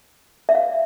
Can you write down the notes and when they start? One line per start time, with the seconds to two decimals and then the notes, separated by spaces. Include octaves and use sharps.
0.49 E5
0.55 F5